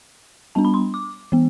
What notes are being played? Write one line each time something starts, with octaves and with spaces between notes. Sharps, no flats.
G3 B3 D4 A5
B5
C6
D6
E3 B3